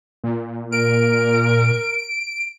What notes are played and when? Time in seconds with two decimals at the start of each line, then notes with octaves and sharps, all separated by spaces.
0.24 A#2
0.72 A#4 D7